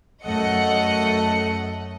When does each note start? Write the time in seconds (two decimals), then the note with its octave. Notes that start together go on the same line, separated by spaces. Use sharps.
0.24 F#2 A3 A4 D#5 F#5 C#7